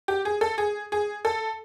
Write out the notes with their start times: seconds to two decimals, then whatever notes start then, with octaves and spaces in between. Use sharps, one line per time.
0.08 G4
0.25 G#4
0.41 A4
0.58 G#4
0.92 G#4
1.25 A4